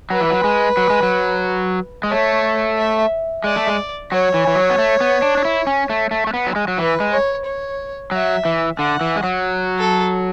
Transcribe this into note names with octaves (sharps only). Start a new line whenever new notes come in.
F#3 B4
E3
F#3
G#3
F#3
G#3
F#3
G#3
A3 C#5
E5
G#3 D5
A3
G#3
F#3 C#5
E3
E3
F#3
B3
A3
B3
D4
D4
E4
C#4
A3
A3
A3
B3
F#3
G#3
F#3
E3 B4
G#3
C#5
C#5
F#3 E5
E3
D3 F#5
E3
G#3
F#3
A4